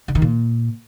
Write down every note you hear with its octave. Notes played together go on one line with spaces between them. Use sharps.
D3
D#3
A#2